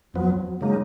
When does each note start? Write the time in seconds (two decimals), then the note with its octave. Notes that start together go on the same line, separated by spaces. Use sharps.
0.14 F2 F3 F#3 B3
0.60 C#3 F#3 G#3 A#3 D#4